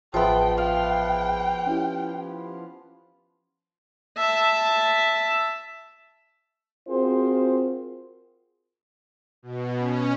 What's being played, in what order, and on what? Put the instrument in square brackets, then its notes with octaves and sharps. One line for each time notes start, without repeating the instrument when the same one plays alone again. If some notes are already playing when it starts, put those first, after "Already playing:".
[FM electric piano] A1 G#4 E5 [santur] F3 B3 [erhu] G5
[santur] F5 [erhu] G5
[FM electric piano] C#4 E4 G4
[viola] E5 A5
[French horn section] C4 F4 F#4 G#4 A#4 C5
[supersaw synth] B2
C#4